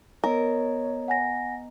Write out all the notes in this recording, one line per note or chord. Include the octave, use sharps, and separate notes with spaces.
B3 A#4 C#5 D#5 A#5
F#5 G#5 A#6